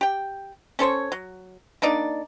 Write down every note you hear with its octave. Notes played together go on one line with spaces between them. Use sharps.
G4 G5
C#4 A4 C5 C#5
F#3
A#3 D4 D#4 D5